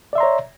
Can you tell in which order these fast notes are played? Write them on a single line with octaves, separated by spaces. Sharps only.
D5 E5 C6 A#5 C#5